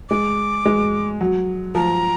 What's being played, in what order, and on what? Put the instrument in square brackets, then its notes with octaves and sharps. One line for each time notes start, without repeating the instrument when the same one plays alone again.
[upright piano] G#3 [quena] D6
[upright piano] G#3
F#3
[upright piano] F3 [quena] A#5